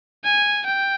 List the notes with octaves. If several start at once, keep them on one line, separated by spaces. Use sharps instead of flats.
G#5
G5